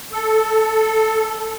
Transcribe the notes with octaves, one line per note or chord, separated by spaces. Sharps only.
A4